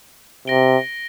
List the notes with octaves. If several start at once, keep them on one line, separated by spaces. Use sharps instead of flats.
C3 A#6 D7 G7